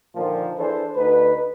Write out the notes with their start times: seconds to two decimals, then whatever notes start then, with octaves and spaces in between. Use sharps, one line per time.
0.15 A#2 D3 D#3 F3
0.57 E3 D4 G#4 A4 B4 C5
0.96 D2 D3 D#4 B4